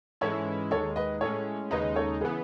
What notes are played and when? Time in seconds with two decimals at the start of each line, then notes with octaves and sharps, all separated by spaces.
0.21 G#2 E3 G#3 C#4 E4 A4 C#5
0.71 D#2 D#3 G#3 A4 C#5
0.96 B4 D#5
1.21 A2 G#3 C#4 A4 C#5
1.71 D#2 C#3 G#3 D#4 B4 D#5
1.96 A4 C#5
2.21 C#3 E3 B3 G#4 B4